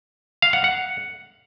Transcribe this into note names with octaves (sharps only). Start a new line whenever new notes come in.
F5
F#5
F#5